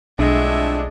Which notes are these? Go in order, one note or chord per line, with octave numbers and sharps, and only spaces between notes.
B1 F2 A2 G#3 D4 E5